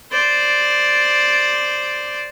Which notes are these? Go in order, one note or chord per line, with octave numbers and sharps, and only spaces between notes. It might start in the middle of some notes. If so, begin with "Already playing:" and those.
C5 D5